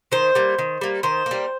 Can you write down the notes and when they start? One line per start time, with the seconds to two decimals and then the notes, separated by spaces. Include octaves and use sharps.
0.12 D#3 C5
0.35 G3 A#3
0.58 D#3
0.81 G3 A#3
1.03 D#3 C5
1.26 G3 A#3